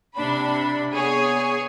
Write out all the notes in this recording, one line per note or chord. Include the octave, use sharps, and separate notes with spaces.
C3 D4 B5
B3 G#4 C#5